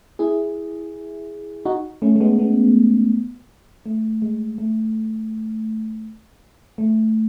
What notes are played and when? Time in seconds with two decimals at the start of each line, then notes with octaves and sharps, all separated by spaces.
0.19 E4 G#4
1.65 D#4 F#4
2.02 A3 C#4
2.16 A3
2.20 G#3 B3
2.39 G#3 B3
3.86 A3
4.22 G#3
4.58 A3
6.78 A3